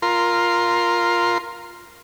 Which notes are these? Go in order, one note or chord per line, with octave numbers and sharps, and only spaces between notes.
F4 A#4 C6